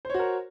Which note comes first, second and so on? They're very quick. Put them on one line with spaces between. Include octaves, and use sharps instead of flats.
C5 C#5 F#4 A#4